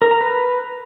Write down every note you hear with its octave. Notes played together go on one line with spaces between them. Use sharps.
A#4
A#5
B4